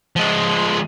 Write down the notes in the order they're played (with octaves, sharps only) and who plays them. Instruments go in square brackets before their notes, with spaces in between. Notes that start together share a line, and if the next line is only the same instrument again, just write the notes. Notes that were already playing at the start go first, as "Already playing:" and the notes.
[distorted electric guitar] F3 G#3